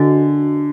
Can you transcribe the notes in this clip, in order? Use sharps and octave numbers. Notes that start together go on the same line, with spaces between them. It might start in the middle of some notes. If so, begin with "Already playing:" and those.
Already playing: D3 F#4 D#5 G#5